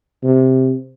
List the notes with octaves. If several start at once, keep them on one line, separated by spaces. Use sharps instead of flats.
C3